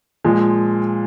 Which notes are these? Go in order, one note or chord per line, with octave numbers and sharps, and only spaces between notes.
A#2 F3 G#3